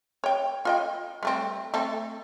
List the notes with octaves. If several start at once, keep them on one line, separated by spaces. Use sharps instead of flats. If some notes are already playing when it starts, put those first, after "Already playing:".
C#5 G5
F4 D#5 G5
G3 A3 C4
A3 C4 A4